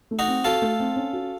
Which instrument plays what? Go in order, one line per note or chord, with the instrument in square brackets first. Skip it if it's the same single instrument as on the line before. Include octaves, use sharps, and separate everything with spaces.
[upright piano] A3
[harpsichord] D#4 F#4
[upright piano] C4
[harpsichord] F4 A4 [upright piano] F#4
[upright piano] A3
C4
C#4
F#4